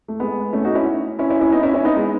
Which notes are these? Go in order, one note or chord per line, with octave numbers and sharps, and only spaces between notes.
A3
G#3 B3
A3 C#4
D#4 F#4
C#4 E4
C#4 E4
C#4 E4
C#4 E4
B3 D#4
C#4 E4
C#4 E4
B3 D#4
G#3 B3